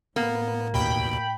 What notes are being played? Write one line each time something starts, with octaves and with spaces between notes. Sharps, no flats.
A2 A#3 B3
D#2 B2 G5 B5